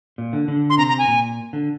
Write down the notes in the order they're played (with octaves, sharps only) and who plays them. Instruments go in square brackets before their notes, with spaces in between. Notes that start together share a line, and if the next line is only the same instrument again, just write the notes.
[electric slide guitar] A#2
D3
D3
[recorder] C6
[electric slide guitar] C3 [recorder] A#5
[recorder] A#5
G#5
[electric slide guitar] A#2
D3